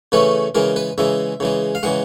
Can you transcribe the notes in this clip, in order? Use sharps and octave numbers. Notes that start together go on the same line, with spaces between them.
C#3 E3 A3 C#4 B4
C#3 E3 G#3 A#4
B4
C#3 E3 G#3 E5
C#3 E3 G#3
F5
C#3 E3 G#3 F#5